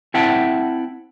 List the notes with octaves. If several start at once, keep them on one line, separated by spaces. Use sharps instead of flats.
C4 E4 E5 F#5 G5 A5